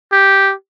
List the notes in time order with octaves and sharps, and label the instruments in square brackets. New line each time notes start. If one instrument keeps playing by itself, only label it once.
[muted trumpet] G4